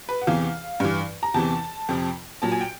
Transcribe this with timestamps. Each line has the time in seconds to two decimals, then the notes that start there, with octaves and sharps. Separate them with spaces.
0.09 B4
0.21 F#5
0.27 E2 C3 E3 F5
0.80 G2 E3
1.23 A#5
1.34 E2 C3 E3 A5
1.89 F2 C3 F3
2.42 A#2 F#3 A5
2.52 G#5
2.61 G5